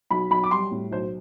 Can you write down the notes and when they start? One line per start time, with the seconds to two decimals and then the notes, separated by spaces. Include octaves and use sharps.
0.11 B1 B5
0.31 B1 B5
0.44 D6
0.51 G3 C6
0.71 A2
0.92 B1 C5